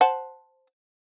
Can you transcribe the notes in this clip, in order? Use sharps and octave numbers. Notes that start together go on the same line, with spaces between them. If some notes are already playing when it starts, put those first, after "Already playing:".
C5 F#5 A5